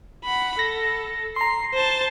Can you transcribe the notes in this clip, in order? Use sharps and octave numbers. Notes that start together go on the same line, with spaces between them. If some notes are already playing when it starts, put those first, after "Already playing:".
F#5 B5
A4 A#6
A#5 C6 C7
C5 A5